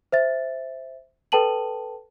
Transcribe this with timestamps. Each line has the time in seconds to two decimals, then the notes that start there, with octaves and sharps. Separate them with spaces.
0.12 C5 E5 A6
1.32 A4 B4 G5 A5 D#7 F#7